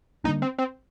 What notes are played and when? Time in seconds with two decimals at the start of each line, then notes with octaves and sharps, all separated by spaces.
0.24 D3 G3 A#3 D4 D#4
0.42 C4
0.58 C4